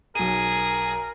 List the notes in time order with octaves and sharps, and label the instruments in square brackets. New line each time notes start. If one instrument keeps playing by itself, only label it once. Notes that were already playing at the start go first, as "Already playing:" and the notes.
[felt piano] B1 D#7 [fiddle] G#4 [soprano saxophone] A#4